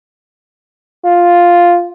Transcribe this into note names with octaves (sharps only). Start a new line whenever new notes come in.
F4